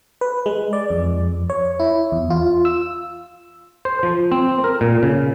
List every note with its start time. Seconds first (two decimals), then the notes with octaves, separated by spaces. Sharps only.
0.21 B4
0.46 G#3
0.73 D5
0.90 F2
1.50 C#5
1.79 E4
2.12 E2
2.30 F4
2.65 E6
3.85 C5
4.03 F3
4.32 C4
4.64 A#4
4.81 A#2
5.03 C#3